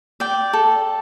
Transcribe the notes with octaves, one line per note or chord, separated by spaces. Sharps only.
D5 G5
A4